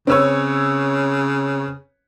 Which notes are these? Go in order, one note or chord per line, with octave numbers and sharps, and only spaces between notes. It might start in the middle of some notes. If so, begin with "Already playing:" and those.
C#3 C4 C#4 B4 C#5 E6